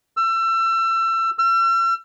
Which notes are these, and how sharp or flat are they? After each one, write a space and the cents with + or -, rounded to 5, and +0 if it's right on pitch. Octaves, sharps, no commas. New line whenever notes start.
E6 +30
E6 +45